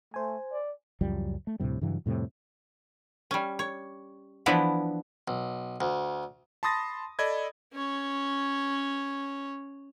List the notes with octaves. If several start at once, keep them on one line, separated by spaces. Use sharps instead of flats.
A3 C5 G#5
D5
C#2 F#2 F3 G3
A3
D2 A2 C3 G3
G2 C#3 E3 F#3
F2 A2 C3 G3
G3 C#4
C#5
E3 F3 B3 D4 E4
B1
D2
A5 B5 C6 D#6 A6 A#6
A4 D5 D#5 B5 G#6
C#4 C#5